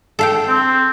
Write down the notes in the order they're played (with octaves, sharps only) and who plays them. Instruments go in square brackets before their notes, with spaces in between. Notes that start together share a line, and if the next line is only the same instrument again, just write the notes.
[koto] A4 F5 G5
[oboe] C4